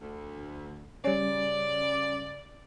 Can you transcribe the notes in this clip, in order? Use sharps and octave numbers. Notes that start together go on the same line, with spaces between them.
D2
C#3 G3 C#4 D5